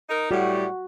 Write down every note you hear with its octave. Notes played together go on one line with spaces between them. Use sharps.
D#4 A#4
A2 G3 F#4